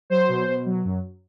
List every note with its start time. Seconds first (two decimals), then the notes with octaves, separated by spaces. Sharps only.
0.10 F#3 C5
0.28 B2
0.48 B2
0.66 F#3
0.84 F#2